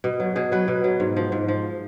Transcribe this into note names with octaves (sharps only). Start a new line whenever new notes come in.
B2
F#3
B2 G#4
F#3 B4
B2
F#3
G#2
F3
G#2
F3